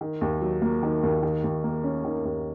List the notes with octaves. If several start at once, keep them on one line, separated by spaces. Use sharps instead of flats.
D#3
D#2
F#3
A#3
D#3
D#2
D#3
D#2
A#3
C#4
D#3
D#2